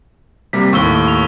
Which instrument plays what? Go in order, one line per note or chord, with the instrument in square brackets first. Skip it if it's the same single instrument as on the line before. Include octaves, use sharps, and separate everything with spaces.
[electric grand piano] C3 G3 A#3 [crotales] B6
[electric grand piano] D#2 A2 [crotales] C#6 E6 G7
[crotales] F7